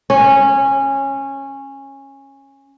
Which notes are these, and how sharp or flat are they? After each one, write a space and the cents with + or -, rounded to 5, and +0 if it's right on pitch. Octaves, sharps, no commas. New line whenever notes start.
C#4 -15